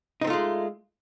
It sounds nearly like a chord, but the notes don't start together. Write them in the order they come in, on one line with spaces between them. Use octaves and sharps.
D#4 C4 A3 F4 G#3